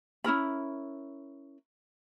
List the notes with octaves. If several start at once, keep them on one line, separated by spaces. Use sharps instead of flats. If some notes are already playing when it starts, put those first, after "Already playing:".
C#4 E4 A#4 B5